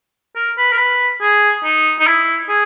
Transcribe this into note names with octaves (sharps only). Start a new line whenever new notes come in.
A#4
B4
A#4
B4
G#4
D#4
D#4
E4
G#4